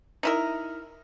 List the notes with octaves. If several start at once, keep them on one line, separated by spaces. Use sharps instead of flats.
D#4 E4 A#4